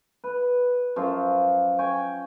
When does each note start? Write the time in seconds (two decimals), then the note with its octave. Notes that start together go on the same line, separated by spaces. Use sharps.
0.24 B4
0.96 F#2 F3 C5
1.79 G5 G#5 C#6